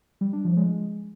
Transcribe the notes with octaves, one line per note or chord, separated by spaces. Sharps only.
G3
D4
F3
G#3